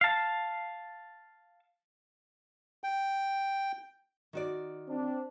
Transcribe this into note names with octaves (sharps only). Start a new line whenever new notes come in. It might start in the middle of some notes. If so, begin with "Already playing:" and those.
F5 A5
G5
D#3 F#4 D5
C4 D4